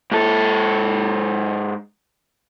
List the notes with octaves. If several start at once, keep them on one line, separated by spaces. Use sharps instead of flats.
G#2 A4